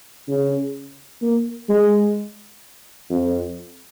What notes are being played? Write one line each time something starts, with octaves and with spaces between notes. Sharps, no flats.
C#3
A#3
G#3
F2